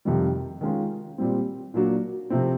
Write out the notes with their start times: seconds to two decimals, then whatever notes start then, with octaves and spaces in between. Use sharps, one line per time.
0.05 F2 C3 D#3 G3
0.61 D#3 G#3 C#4 F4
1.18 A#2 G3 C4
1.74 A#2 F#3 A#3 D4 F#4
2.30 C3 F3 A3 C4